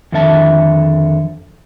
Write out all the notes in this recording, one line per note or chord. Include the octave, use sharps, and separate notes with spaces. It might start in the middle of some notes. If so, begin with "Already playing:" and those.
F2 D3 D#3 A4 E5 A5